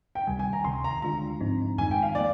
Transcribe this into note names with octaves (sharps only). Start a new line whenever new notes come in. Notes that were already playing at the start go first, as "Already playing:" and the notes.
G5
D2 C3 D#3 G3 G#5
G#5
A#5
D2 C3 D#3 C6
A#5
D3 G#3 D4 F4 A#5
G#2 F3 C4 D#4
F2 D#3 G#3 D#4 G#5
G5
F5
D#3 A#3 D5